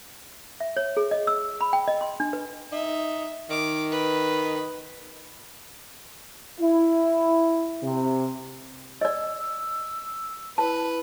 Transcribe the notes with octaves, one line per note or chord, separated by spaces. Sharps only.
E5
C#5
G#4
D#5
E6
B5
G5
D#5
C6
D4
B4
D#4 E5
D#3 D6
B4
E4
C3
D5 D#5 E6
E4 B4 A5